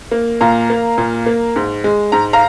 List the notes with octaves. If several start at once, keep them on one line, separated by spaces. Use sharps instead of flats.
A#3
A#2 F5 A#5
A#3
A#2
A#3
G#2
G#3
G#2 A#5
F5 A#5